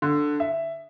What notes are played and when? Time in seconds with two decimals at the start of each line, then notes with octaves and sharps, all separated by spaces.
0.02 D3
0.40 E5